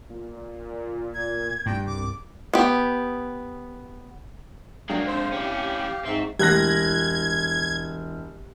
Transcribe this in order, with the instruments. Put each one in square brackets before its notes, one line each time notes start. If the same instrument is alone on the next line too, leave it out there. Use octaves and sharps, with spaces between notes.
[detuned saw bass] A#2
[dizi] G#6
[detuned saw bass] D#1 [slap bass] G2 [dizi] G5
[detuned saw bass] C2 [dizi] D6
[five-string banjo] B3 G4
[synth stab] F#3 D4 G5 [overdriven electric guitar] G#3 A#3 [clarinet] F5
[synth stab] C4 D4 [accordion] C5
[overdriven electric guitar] C#4 E4 [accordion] G4
[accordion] G#2 [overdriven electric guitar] C4 [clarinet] E5 [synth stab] C#6 E6
[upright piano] E1 F#6 A#6 [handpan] G4 [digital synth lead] G#6